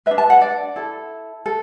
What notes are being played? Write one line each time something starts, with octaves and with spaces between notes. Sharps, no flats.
B4 E5
D4
A5
F#5
D5
E4 A4
A4